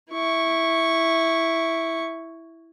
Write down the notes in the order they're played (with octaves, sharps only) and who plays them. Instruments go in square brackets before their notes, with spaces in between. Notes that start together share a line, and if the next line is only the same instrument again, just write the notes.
[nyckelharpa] E4 C#6